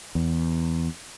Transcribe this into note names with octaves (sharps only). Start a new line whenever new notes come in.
E2